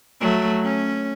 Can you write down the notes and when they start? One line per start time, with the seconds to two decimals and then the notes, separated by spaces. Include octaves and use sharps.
0.21 F#3 A3
0.64 C#4